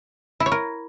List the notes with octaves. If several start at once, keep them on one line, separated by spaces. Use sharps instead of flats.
E4
C#5
A#4